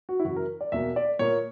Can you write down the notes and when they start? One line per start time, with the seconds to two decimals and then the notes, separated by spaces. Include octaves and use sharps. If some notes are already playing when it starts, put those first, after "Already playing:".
0.09 F#4
0.20 E4
0.24 F#2 C#3 E3 F#4
0.36 A#4
0.61 D5
0.72 E2 B2 A#3 E5
0.96 D5
1.19 A#2 A#3 C#5